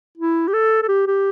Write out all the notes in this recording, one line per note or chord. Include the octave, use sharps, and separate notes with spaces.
E4
G4
A4
A4
G4
G4